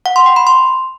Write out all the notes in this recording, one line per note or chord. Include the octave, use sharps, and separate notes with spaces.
F#5
C6
G5
B5
C6